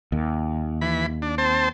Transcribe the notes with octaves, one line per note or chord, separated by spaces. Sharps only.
D#2
E3 B5
D4
C4 C5 A5